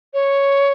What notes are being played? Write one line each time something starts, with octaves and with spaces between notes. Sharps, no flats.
C#5